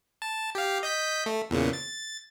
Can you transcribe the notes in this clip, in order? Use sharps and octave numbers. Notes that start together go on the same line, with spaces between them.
A5
G4 F5
D#5 G6 B6
A3
E2 A#2 C#3
A6